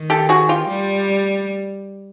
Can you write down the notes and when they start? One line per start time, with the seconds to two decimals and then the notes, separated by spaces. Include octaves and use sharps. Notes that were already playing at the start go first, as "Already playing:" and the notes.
Already playing: D#3
0.10 G4 A4
0.29 F#4 G#4
0.49 F4 G4
0.68 G3